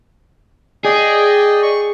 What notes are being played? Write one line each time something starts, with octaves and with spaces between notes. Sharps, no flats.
G#4 D5 D#5 G5
C#6